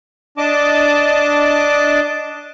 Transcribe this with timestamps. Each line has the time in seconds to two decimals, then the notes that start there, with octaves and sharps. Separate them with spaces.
0.38 D4 D#5 A5 D6